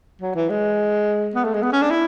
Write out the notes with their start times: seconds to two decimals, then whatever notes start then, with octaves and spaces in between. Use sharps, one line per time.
0.22 F#3
0.35 E3
0.50 G#3
1.35 B3
1.44 A3
1.54 G#3
1.63 B3
1.72 C#4
1.82 D4
1.91 E4